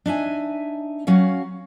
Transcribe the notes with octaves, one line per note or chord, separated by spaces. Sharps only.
D4 D#4 E5 G#5
F#3 C#4 F#4 F5